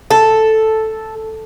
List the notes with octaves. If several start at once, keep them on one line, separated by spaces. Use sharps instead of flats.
A4